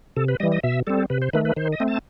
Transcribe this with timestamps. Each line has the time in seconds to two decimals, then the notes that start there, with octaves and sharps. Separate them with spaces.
0.16 C3 A4
0.28 B4
0.40 E3 G3 D#5
0.52 D#5
0.63 B2 E5
0.87 G3 C4 A4
1.10 C3 B4
1.22 C5
1.33 D#3 A3 B4
1.45 B4
1.56 D#3 C5
1.72 D#5
1.80 A3 C4
1.88 A5